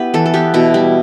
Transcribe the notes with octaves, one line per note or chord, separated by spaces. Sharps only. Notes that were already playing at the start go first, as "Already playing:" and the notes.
Already playing: B3 E4 G4 B4
E3 A4
A4
B3 G4
B2 E4
G3 E4